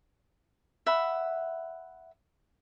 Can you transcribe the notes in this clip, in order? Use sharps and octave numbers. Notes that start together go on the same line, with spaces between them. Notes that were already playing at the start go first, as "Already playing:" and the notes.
E5 F#5 B5